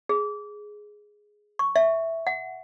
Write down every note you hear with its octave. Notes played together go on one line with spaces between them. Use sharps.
G#4
C#6
E5
F#5